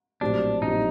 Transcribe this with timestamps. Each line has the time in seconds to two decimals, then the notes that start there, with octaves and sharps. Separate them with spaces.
0.21 A#1 A2 F#3 C4 D4 G4
0.62 A#1 A2 F#3 C4 D#4 G4